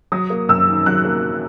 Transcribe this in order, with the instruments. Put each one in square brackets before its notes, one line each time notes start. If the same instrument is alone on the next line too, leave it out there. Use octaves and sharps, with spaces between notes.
[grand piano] F#3 [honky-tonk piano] D#6
[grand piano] A#3
[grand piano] F#2 [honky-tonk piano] E6
[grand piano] D#3
[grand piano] F#3 [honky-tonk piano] F#6
[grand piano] A#3